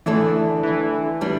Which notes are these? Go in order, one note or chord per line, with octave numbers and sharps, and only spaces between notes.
E2 D3 E3 A3 D4 A4
E3
E3 G3 D4